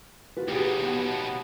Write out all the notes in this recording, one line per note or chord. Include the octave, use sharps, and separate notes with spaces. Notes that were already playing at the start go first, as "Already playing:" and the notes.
F4 F#4 B4
D#2 B2 G4 G#4
B3